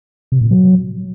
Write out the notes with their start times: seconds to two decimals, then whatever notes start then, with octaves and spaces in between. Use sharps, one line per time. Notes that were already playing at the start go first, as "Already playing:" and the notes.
0.32 C3
0.41 A#2
0.51 F#3